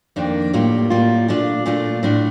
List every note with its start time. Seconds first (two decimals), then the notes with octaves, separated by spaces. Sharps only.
0.16 F2 D#3 A#3 D4
0.53 A2 G3 A#3 F4
0.90 A2 G3 A#3 F4
1.28 A#2 A3 D4 F4
1.66 A#2 A3 D4 F4
2.03 A2 A3 D4 F4